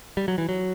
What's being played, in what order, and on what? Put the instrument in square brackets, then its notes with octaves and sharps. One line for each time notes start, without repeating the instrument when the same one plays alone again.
[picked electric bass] G3
F#3
E3
F#3